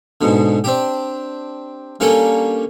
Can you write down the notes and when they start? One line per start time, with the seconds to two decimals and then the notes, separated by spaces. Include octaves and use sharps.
0.21 G#2 B2 D3
0.64 C4 D4 G4
2.00 G3 A#3 C#4 D4 F4 A4